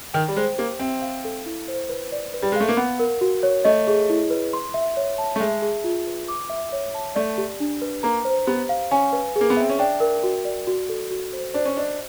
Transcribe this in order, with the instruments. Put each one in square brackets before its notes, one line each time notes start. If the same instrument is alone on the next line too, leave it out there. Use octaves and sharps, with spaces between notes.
[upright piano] D#3 [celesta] G5
[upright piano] G3
[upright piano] G#3 [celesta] C5
[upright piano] A#3 [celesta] G4
[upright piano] C4 [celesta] E5
[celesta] F5
A4
E4
C5
B4
D5
B4
[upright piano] G3
G#3
[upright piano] A3 [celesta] F5
[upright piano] A#3
[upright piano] B3 [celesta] F#5
[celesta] A#4
F#4
C#5
[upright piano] A3 [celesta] D#5
[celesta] G#4
E4
B4
C6
E5
C#5
A5
[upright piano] A3
[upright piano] G#3 [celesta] E5
[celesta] G#4
F4
B4
D6
E5
C#5
A5
[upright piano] A3 [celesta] D5
[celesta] G4
D4
B4
[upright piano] A#3 [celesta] A#5
[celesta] C5
[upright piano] B3 [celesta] G4
[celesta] F5
[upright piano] C#4 [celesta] G#5
[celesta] B4
G#4
[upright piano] A#3
B3
[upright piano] C4 [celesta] E5
[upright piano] C#4
[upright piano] D4 [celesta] G5
[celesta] A#4
F#4
D5
F#4
A4
F#4
C5
[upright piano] D4 [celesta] C5
[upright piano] C#4
[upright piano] D4 [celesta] D#5